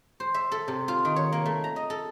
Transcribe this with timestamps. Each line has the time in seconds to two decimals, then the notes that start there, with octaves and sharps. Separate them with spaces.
0.20 C5
0.34 E5
0.52 A4
0.68 C3
0.88 F4
1.05 D#3
1.16 C#5
1.32 A#3
1.46 A3
1.64 A#5
1.76 D#5
1.90 A4